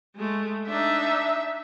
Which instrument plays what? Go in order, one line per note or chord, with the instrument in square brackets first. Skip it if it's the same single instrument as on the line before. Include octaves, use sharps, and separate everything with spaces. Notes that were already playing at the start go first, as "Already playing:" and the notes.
[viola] G#3 A3
[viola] D4 D#4 [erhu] E5